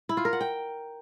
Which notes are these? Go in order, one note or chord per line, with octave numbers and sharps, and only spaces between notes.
E4
F4
A#4
F#5
G5